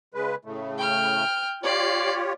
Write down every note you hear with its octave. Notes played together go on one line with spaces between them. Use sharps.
C#3 G#3 B4
A2 C#3 A3
G5 F6
F4 G4 C#5 D5 C7